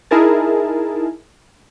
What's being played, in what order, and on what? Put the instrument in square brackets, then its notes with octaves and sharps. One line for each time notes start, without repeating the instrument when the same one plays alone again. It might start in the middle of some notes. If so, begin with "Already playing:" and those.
[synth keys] D#4 E4 G#4 A#4 A5